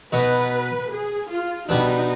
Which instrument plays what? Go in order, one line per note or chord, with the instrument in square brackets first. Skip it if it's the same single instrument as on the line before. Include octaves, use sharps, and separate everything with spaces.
[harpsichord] B2 B3 D#4 [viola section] B4
[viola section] G#4
F4
[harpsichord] B2 G3 B3 D4 [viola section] D#4